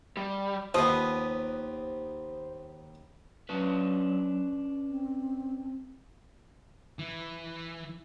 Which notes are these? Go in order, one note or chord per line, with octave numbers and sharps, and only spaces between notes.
G3
D#2 F3 B3 C5 D#5 D#6
F#3 C#4 D4 B4
C4
E3